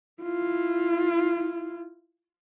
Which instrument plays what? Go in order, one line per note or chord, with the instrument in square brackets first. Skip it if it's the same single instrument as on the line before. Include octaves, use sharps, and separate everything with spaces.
[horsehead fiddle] E4 F4